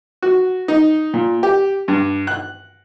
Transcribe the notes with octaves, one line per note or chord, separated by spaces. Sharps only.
F#4
D#4
A#2
G4
G2
F#6